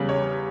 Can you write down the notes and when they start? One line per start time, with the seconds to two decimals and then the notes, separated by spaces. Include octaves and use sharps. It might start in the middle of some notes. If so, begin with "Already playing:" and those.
Already playing: E2 C#3 G3
0.09 C#5